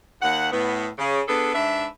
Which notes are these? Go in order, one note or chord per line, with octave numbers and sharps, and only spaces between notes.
D#2 F#5
A2 B3
C#3
B3 D4 G#4 A4 B4
G#2 D4 B4 E5